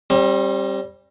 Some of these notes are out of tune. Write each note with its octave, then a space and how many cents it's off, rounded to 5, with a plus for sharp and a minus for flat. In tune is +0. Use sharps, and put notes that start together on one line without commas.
G3 +0 C4 +40